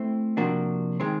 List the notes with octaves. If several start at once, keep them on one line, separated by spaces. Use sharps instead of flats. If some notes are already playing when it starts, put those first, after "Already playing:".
Already playing: A3 C4 E4
C3 F3 A#3 D4 F#4
D#3 G#3 C4